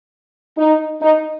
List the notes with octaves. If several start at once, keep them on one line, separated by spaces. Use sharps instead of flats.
D#4
D#4